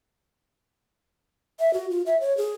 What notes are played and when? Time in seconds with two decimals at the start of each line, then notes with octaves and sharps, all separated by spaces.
1.60 E5
1.74 F#4
1.90 F4
2.06 E5
2.21 C#5
2.37 G#4